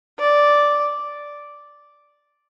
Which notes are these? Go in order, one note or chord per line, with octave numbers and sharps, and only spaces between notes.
D5